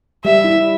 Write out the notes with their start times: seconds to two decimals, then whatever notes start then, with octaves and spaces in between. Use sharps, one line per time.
0.24 G3 E5
0.44 E4